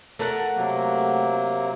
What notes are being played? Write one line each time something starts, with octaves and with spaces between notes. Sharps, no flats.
A3 A#4 F#5
C3 F#3 A#3